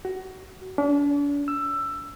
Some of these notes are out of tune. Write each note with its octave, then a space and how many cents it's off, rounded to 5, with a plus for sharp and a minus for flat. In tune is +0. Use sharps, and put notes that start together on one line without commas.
F#4 +25
D4 -40
E6 +15